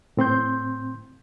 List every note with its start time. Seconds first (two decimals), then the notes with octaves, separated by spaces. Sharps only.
0.17 A2 C4 C6 G6